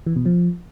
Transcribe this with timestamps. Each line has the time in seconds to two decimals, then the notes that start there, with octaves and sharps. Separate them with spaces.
0.06 E3
0.16 B2
0.26 F3